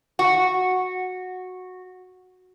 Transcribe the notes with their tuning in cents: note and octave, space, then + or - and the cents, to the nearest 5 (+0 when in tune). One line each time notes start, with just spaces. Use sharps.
F#4 -10